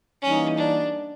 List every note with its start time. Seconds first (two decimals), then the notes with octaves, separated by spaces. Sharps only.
0.22 E3 G3 A#3 C#4 D#4
0.58 D4